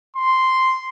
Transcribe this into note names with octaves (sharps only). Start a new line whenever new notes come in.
C6